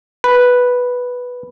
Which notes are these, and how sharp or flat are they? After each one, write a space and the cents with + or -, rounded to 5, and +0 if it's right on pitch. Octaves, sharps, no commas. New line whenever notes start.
B4 -5